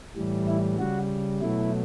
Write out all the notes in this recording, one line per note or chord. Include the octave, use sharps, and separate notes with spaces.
A2 E3 G3
E4
C#3 G3 F#4
B2 F#3 A3 E4